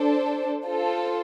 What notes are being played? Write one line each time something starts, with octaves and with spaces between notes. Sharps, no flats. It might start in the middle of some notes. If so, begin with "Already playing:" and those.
Already playing: D4 A4 C5
F4 A4 C5